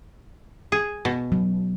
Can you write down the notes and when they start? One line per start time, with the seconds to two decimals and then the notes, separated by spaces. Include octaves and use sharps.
0.72 G#4
1.05 B2
1.32 F#3